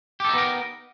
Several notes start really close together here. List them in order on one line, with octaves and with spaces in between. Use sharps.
G4 A4 D#4 B3 A#4